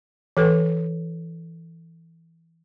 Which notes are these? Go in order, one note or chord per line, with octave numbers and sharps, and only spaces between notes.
E3 A4 B4